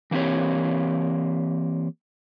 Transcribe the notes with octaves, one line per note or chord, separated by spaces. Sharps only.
E3 A#3 C4 G4 C#5